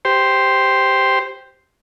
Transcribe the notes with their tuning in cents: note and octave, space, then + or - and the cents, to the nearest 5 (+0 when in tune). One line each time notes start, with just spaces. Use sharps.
G4 +0 C5 +0